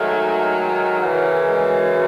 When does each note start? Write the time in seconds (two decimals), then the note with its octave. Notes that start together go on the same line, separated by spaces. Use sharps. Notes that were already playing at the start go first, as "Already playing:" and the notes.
Already playing: G#2 D#3 F#3 A3
0.99 F#2 C#3 E3
1.45 G#3